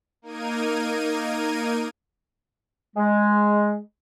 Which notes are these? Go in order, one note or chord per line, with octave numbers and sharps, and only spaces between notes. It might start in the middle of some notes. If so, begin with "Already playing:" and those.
A#3 D#4 A#4 G#6 D#7
G#3